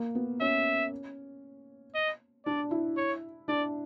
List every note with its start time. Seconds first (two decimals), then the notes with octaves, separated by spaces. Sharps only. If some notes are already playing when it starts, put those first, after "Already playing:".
Already playing: A#3
0.15 B3
0.41 C#4 E5
1.95 D#5
2.46 D4 D5
2.71 E4
2.97 C#5
3.48 D4 D5